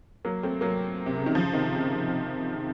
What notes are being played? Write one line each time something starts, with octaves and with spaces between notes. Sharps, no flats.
F#3 A#3
A3 C4
F#3 A#3
C3
C#3
D#3
C#3 F3
C3 D#3
C#3